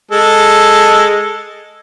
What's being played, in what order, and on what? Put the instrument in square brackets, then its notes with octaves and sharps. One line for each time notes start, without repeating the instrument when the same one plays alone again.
[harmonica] G#3 A4